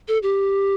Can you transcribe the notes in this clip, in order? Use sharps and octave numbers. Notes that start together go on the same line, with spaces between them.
A4
G4